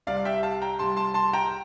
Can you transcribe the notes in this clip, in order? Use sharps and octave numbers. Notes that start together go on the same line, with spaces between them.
C2 C3 G3 D5 F5
E5 G5
F5 A5
G5 A#5
C2 C3 G3 A5 C6
A5 C6
A5 C6
G5 A#5